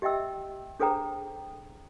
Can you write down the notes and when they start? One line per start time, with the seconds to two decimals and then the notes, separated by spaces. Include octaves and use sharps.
0.02 G4 D#5 E5 G5 E6
0.80 D4 G#4 A4 C5 G5 A#5